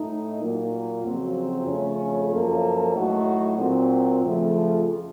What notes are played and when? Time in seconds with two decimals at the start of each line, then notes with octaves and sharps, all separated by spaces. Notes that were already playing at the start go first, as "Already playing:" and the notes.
Already playing: A2 A3 D#4
0.39 A#2 F#3 A#3
1.02 F2 C#3 F#3 C4 F#4
1.66 F2 C#3 A3 C#4
2.31 F#2 F3 A#3 C#4 A4
2.94 A2 F#3 A3 D#4 F#4
3.58 A#2 F#3 C4
4.23 F2 C#3 F3 A3